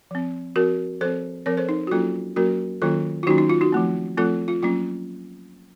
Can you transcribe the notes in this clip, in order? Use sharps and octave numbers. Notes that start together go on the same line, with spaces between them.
F3 C4
F3 C4 F#4 A#4
F3 C4 A4 C5
F3 C4 A#4 C#5
A4 C5
D#4
F#4
F#3 A#3 C#4 F4 A4
F#3 A#3 C#4 F#4 A#4
D#3 F#3 A#3 C#4 F4 A4
F4
D#3 F#3 A#3 C#4 D#4 F#4
D#4
F4
D#4 F#4
F3 A3 C4
F3 A3 C4 F4 A4
F4
F#3 A#3 C#4 F4